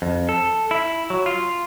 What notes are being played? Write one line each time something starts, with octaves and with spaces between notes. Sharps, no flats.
F2
A4
E4
F#3
F4